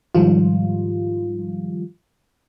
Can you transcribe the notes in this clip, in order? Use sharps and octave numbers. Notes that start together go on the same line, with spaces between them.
G#2 D#3 F3 G3 F4